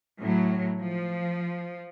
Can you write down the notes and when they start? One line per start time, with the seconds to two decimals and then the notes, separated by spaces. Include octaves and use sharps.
0.20 A2 F#3
0.82 F3